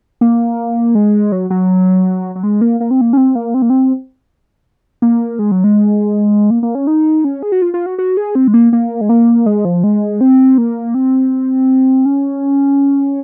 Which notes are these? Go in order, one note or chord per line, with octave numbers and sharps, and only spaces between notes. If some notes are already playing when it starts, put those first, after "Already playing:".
A#3
G#3
F#3
F#3
F#3
G#3
A#3
A#3
C4
A#3
C#4
C4
A#3
C4
A#3
C4
A#3
G#3
F#3
G#3
A#3
A#3
C#4
D#4
C#4
G#4
F#4
F4
F4
F#4
F#4
G#4
C4
G#3
A#3
A#3
G#3
A#3
G#3
F3
G#3
C4
A#3
C4
C#4